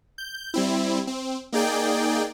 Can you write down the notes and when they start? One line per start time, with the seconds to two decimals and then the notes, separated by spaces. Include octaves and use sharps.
0.18 G6
0.54 G3 C4 E4
1.07 C4
1.53 A#3 D#4 G#4 D5 G5